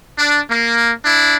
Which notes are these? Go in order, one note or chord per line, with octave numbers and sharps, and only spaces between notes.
D4
A#3
D4 E4